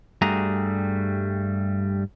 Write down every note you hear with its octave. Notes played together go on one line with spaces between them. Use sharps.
G2 G3 A3 F#4 G#4 A#5